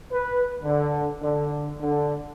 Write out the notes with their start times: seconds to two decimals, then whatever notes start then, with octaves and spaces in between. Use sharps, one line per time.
0.11 B4
0.62 D3
1.22 D3
1.81 D3